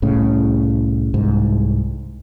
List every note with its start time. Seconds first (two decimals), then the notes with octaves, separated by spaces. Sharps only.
0.02 C2 A2 C#3
1.14 C2 G#2